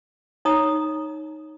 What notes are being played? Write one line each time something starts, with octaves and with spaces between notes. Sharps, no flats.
D#4 C#5 A#5 D#6